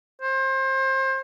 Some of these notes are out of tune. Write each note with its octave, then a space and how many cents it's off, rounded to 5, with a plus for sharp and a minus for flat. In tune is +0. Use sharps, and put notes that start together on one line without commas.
C5 +30